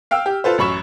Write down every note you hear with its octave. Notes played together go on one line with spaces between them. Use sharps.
F5 G5 E6 F6
G4
F4 A4 B4 C5
A1 F#2 B5 C#6 E7